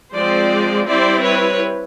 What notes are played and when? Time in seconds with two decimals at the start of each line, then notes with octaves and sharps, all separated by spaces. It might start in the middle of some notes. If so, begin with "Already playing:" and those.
0.15 F3 G#3 C4 C5 D5
0.87 G3 C4 E4 C5 D5
1.24 B4 C#5